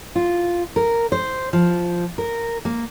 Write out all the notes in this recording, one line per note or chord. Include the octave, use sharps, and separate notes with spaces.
F4
A#4
C5
F3
A#4
A#3